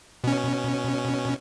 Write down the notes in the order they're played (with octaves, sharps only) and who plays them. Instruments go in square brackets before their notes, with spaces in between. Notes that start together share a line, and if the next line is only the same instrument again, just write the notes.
[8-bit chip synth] B2 C#4